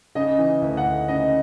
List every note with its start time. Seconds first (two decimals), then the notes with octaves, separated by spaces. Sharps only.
0.15 C#3 D#5
0.38 E3
0.62 D2
0.77 F#5
0.85 D2
1.08 C#3 D#5